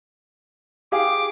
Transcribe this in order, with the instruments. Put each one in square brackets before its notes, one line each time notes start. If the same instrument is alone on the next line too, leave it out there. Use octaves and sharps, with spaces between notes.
[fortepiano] G4 G#4 F5 [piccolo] D6